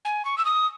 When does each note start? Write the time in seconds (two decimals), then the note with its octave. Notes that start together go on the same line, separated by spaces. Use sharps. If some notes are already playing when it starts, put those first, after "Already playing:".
0.05 G#5
0.25 C#6
0.38 E6
0.45 D#6